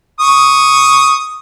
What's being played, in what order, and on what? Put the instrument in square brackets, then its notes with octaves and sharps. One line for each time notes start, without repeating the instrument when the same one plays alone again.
[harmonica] C#6 D#6